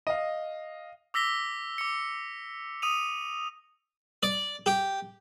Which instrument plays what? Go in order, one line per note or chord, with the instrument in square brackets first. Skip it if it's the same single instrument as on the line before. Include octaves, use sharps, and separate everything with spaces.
[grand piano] D#5 F5
[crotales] D6 E6 A#6 B6 G7
D6 C#7
D#6 D#7 F7
[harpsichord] D5
G4